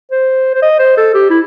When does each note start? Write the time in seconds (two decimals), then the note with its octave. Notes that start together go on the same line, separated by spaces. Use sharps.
0.11 C5
0.55 C5
0.62 D#5
0.79 C5
0.97 A4
1.14 G4
1.30 E4